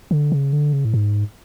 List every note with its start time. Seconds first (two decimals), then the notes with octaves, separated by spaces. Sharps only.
0.11 D3
0.32 C#3
0.53 D3
0.73 C#3
0.85 A2
0.94 G#2